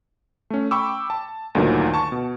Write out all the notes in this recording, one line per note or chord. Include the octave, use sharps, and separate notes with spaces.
A3 C#4
G5 B5 C#6 D6 E6
A5
D2 G2 A#2 D3 D#3 F#3
A5 C#6
B2